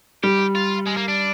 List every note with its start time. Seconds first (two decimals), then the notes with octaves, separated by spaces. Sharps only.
0.23 G3 G4
0.55 F4
0.87 G#3
0.97 A#3
1.08 D4